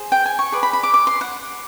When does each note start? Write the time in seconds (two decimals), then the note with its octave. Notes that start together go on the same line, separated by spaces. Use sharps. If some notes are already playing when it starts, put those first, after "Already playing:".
Already playing: G#4 C5
0.12 G5
0.26 G#5
0.39 C#6
0.52 G#4 B4 D5
0.63 B5
0.73 B5
0.83 D6
0.94 D6
1.07 C6
1.21 F#5